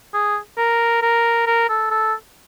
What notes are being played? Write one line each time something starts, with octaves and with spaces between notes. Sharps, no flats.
G#4
A#4
A#4
A#4
A4
A4